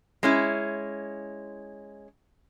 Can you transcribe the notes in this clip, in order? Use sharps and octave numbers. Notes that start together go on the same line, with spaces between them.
G#3 C#4 E4